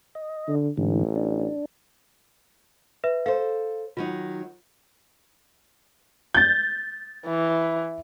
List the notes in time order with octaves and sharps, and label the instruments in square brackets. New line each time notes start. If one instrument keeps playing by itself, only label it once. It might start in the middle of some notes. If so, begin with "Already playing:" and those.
[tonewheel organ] D#5
[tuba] D3
[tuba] A1 [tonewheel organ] G#2 D3 E3
[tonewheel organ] D4
[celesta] B4 E5
[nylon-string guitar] A4 C5 [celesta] F5
[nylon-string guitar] D#3 F#3 D#4 [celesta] F4
[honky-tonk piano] G6 A6
[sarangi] E3